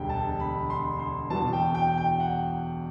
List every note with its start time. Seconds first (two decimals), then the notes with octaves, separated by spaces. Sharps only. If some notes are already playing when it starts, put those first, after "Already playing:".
Already playing: E1 D2 D3 G3 G5
0.09 A5
0.40 B5
0.70 C6
0.99 C6
1.30 E2 B2 F#3 A5
1.53 G5
1.75 G5
1.98 G5
2.20 F#5